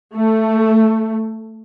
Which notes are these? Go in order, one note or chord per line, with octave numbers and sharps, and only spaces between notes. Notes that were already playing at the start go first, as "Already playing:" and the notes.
A3